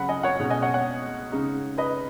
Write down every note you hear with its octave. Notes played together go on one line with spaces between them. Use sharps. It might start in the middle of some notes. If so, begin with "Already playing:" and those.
Already playing: C#3 F#3 F#5 B5
D#5 G#5
C#5 F#5
B2 G#3 C#4
D#5 G#5
C#5 F#5
C#5 F#5
C#3 G#3 D#4
B4 D#5